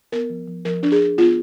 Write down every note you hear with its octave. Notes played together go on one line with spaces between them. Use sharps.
B3 A#4
F3
F3
F3 A#4
D4
G#4
D4
B3 F4